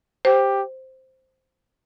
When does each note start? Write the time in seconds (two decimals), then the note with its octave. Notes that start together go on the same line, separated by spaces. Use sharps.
0.25 G4 C5